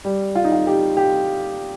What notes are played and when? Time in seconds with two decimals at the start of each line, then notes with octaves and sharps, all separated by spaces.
0.05 G3
0.35 F4
0.44 D#4
0.52 F4
0.67 G4
0.97 G4